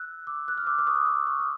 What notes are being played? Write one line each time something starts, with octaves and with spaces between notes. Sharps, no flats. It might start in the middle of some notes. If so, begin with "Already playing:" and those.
Already playing: E6 F#6
D6 E6
F#6
F6
D6 E6
D6
C#6 D#6
D6 E6
C#6 D#6
D6